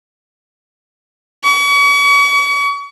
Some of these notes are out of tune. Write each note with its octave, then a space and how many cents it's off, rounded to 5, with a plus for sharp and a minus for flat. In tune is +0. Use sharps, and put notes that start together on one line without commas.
C#6 +40